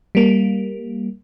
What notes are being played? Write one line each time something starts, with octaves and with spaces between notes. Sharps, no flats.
G3 A#3